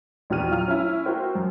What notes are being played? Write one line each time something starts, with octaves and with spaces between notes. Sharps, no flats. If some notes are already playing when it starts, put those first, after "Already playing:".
A#1 E2 F#4 G4 F6 D#7
F3 F#3 F4 F6
C#4 E4
F#4 A#4 C5 G5
F#2